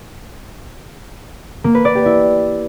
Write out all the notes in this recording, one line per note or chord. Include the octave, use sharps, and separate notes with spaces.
A#3
B4
D5
G4
E4